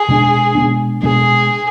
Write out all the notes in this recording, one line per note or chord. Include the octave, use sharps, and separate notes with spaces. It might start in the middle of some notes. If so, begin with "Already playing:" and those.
Already playing: G#4
B2 G#3 B3 D4
B2 G#3 B3 D4
B2 G#3 B3 D4 G#4